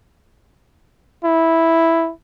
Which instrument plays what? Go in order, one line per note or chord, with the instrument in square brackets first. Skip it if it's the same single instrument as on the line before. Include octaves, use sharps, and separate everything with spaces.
[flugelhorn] E4